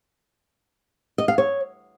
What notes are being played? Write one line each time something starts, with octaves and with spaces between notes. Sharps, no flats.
D#5
F5
C#5